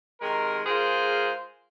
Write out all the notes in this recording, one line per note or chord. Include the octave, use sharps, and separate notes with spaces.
C3 D#3 G#3 A#4
G#3 F4 G#4 A#4 C5